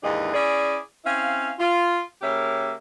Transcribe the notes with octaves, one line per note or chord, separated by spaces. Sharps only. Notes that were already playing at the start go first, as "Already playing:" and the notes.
D#2 G#2 E3 D4 G#4 D#5
C#4 E4 G#4 D5
C4 C#4 E4 F5
F4
C#3 A#3 G4 A#4 C#5 E5